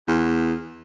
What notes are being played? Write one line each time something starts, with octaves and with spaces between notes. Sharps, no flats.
E2